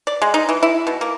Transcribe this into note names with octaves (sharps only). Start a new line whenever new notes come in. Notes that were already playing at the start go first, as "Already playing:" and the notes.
D5
G#3
D#4
E3
E4
B2
A#3